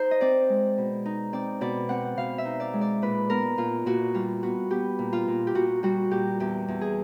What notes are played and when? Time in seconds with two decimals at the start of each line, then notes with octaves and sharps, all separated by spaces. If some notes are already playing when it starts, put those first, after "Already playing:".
Already playing: D#4 C5
0.11 D#5
0.21 C4 D5
0.49 G#3
0.78 B2
1.05 D#4
1.33 C4 D5
1.61 B2 D5
1.89 C4 F#5
2.17 B2 F5
2.38 E5
2.45 D#4
2.60 D5
2.73 G#3
2.81 D5
3.02 A#2 B4
3.30 B3 A#4
3.58 A#2 F4
3.86 A#2 F#4
4.14 G3 F4
4.43 B3 F#4
4.70 B3 G4
4.99 A#2
5.13 F4
5.28 A#2
5.47 G4
5.55 A#2 F#4
5.83 G3 F#4
6.11 A#2 G4
6.40 E2 G4
6.68 E2
6.81 G#4